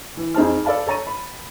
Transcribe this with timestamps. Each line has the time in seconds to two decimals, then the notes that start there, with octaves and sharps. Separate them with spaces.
0.17 E3
0.35 F2 D#4 G#4 C5 A5 F6
0.65 A4 D5 F5 A5 B5
0.87 A4 C#5 A#5 C#6 A6 D#7
1.07 B5